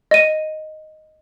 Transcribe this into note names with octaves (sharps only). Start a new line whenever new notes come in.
D#5 D#7